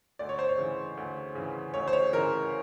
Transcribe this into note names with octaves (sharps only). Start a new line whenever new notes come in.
D2 D5
C#5
C5
C#5
C#3 E3
D2
C#3 E3
D2 C#5
C5
C#5
C#3 E3 A#4